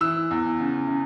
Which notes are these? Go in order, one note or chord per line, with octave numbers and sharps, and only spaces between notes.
E3 E6
E2
C#3
C#3